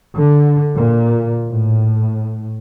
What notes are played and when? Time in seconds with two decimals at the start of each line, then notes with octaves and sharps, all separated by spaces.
0.18 D3
0.75 A#2
1.50 A2